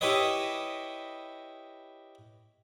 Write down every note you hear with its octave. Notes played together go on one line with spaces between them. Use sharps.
E4 G4 B4 C#5 D#5